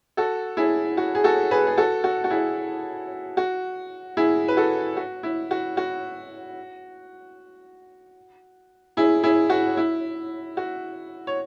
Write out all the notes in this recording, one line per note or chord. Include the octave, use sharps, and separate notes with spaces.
F#4 A4
E4 G#4
F#4
G#4
F#4 A4
G#4 B4
G#4
F#4 A4
F#4
F#4
E4 G#4
F#4
E4 G#4
B4
F#4 A4
F#4
E4
F#4
F#4
E4 G#4
E4 G#4
F#4
E4
F#4
C#5